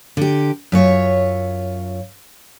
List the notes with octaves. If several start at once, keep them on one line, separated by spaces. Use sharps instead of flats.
D3 G4
F#2 F4 C#5 E5